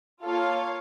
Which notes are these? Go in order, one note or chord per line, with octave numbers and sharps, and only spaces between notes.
A#3 F4 A4 C#5 F5